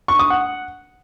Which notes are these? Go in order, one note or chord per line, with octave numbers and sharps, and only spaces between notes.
C#6
D#6
F#5